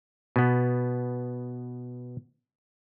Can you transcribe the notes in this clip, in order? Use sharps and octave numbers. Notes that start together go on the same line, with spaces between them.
B2 B3